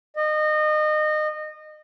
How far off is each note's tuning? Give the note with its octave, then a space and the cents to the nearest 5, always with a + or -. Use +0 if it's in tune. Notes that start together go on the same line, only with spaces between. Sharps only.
D#5 -25